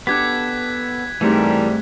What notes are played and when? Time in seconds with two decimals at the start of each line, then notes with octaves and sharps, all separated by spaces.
0.07 B3 D4 G4 A4 D6 F#6 G#6 B6
1.21 G#2 E3 G3 A3 C4 A4 A#4